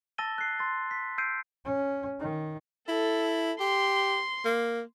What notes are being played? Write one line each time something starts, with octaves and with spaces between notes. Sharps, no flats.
A5 E6 A6 A#6 D#7 G7
F#6 C7
C6 A6
B6
E6 G6 C7 D7 D#7
C#4
D#3
E4 A4
G4 C6
A#3